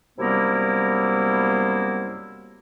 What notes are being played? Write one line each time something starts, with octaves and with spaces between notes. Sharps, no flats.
F#2 C3 G3 A#3 B3 E4